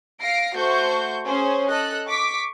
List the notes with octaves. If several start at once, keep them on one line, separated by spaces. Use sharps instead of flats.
F5 A#6 C7 D7
A3 F#4 C5 C#6 G6
C#4 G#4 C5
A4 D#5 F#6
C#6 D6 B6